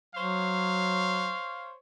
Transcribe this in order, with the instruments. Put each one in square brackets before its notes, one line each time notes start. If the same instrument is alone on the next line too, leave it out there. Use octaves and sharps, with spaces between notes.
[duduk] F#3 [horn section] C5 C#5 F5